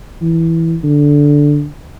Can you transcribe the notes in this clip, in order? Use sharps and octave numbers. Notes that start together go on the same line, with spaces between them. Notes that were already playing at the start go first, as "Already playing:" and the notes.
E3
D3